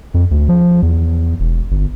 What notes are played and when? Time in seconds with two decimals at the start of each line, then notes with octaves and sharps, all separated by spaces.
0.14 F2
0.31 D2
0.49 F3
0.82 E2
1.40 E1
1.71 G1